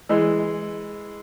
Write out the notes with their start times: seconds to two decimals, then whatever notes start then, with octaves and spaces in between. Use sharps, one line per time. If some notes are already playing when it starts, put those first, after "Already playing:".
0.09 E3 G#3